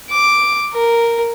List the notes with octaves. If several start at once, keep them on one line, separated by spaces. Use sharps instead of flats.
D6
A#4